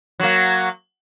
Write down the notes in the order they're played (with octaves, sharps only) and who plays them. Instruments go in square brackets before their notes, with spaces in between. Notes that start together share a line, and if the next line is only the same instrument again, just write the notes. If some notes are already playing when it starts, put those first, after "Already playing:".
[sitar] F#3 A#3